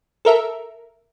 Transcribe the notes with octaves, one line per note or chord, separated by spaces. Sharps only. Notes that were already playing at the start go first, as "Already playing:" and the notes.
A4 A#4 E5